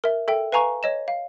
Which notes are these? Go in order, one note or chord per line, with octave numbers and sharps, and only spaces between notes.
A#4 E5
A4 E5 G5
B4 F5 G#5 A#5 C#6
C#5 D#5 E7
F5